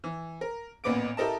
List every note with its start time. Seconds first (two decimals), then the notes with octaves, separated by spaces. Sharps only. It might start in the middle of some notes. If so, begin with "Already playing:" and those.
0.04 E3
0.41 A#4
0.84 A1 A#2 B3 D6 D7
1.17 E4 G4 A4 A#4 D#5 A5